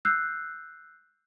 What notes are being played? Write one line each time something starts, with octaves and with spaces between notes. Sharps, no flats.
E6 F#6 G6 C7